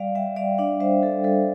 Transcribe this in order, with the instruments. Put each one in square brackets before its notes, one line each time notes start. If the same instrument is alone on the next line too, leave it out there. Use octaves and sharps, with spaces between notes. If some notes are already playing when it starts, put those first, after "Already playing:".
Already playing: [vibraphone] G3 D5 F5
G3 E5 G5
G3 D5 F5
D4 D5 F5
G3 C5 E5
G3 A4
G3 A4